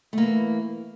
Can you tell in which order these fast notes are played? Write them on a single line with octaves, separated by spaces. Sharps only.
A3 A#3 E3